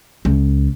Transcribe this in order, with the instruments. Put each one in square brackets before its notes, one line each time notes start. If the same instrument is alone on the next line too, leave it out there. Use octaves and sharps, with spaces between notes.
[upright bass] C#2